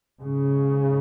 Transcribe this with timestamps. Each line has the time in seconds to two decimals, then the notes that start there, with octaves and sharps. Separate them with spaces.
0.23 G#2 C#3